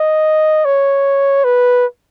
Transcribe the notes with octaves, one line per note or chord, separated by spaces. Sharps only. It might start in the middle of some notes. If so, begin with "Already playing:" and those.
Already playing: D#5
C#5
B4